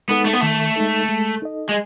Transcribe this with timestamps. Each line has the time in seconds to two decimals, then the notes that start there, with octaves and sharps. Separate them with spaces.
0.08 G#3 B3 D#4 A4
0.25 A3
0.33 B3
0.41 D#3 A3
0.76 G#3 D#4 A4
1.08 G#3
1.42 D#4 A4 D#5
1.69 G#3